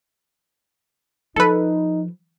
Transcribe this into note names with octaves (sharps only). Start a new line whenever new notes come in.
F3 D#4 A4 B4